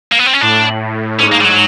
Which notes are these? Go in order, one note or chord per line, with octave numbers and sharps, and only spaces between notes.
A#3
B3
C4
C#4
A2 D4
A2
G#2 C#4
A#3
G3
F#3